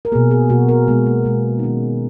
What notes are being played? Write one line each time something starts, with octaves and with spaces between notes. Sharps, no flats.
A#4
B2 A#3 G#4
G#4
B2 A#3 F#4
A#4
B2 G#3 B3
A#3
B2 G#3 B3
D#4
D#3 G#3 C#4